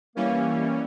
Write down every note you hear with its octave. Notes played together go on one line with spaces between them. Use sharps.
E3 G3 A#3 C#4